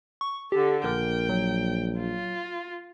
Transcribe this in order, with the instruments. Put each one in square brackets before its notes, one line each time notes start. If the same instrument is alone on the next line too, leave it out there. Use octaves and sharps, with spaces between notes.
[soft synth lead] C#6
[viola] D3 A4 [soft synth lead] G4
[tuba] A#1 [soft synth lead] A#4 [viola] G5
[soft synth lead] F#3
[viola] F4